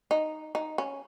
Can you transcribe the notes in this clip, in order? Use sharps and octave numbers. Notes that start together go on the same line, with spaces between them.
D#4
D#4
C#4